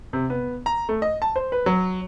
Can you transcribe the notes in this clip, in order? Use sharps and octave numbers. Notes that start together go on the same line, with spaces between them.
C3
B3
A#5
A3
D#5
A5
C5
B4
F#3